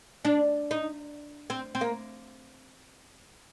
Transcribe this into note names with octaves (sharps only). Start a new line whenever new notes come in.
D4
D#4
C4
C4
A#3